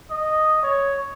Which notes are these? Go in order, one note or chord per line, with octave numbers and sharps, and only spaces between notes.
D#5
C#5